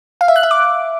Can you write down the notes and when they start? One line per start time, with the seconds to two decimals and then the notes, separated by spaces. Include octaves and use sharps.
0.21 F5
0.28 E5
0.36 F#6
0.43 E5
0.51 D6